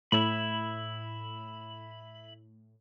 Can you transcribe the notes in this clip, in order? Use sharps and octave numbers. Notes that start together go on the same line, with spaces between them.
A2 E4 B5